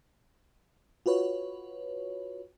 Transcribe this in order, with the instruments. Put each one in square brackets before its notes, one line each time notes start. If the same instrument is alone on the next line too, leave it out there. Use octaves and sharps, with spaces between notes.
[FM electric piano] F4 F#4 B4 C#5